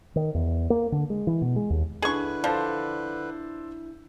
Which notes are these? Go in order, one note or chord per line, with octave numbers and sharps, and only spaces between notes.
D#3
E2
A#3
D3
G#3
E3
B2
G#3
D#2
D3 D4 E4 G#4 B4 D#5 C#6
F3 A4 C5 D5